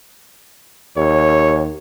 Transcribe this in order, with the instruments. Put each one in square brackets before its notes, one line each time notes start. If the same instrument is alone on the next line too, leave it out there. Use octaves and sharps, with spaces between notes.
[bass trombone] D#2 [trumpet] C#5